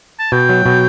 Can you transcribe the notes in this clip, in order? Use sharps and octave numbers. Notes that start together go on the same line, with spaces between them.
A5
B2 G5
F#3
B2